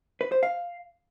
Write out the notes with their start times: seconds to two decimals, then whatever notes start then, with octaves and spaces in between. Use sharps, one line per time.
0.21 B4
0.32 C5
0.43 F5